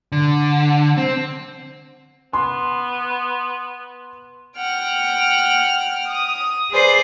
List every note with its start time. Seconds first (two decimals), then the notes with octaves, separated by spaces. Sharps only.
0.12 D3
0.98 C4
2.33 B3 C6
4.56 F#5 G5 F6
6.07 D#6
6.70 G#4 B4 C5 D5